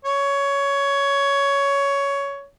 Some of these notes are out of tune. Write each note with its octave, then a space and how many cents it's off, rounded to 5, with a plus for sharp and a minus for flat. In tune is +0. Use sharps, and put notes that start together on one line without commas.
C#5 +15